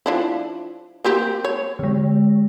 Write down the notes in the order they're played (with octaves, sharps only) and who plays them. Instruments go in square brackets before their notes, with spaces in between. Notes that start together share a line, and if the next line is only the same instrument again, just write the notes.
[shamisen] F3 D4 E4
A#3 C4 G4
C#5
[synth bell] D3 G#3